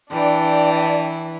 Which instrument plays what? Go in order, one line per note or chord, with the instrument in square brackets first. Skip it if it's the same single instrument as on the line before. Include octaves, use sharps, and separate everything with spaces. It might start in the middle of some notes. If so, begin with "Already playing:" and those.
[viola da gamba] E3 [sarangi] D4 [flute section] D5 G5